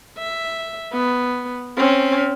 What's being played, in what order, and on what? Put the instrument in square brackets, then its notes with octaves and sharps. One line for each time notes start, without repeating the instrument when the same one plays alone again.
[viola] E5
B3
C4 C#4